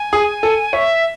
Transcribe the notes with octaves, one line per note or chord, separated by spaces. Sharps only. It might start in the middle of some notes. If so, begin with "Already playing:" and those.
Already playing: G#5
G#4
A4
C#5 E5